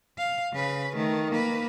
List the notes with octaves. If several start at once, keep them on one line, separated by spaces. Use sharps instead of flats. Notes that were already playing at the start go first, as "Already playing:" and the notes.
F5
C#3 B4
D#3 A3
A#3 B4